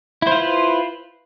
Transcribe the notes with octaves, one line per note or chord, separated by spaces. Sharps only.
E4 F4 B4 C5